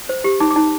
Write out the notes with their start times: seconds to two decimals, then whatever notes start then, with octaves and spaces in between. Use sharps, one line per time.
0.09 C5
0.24 G4
0.40 D#4 D6
0.51 D6
0.56 D#4